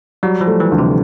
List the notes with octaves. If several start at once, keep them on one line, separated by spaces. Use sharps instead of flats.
F#3 G3
F3
A3
E3
D2
C3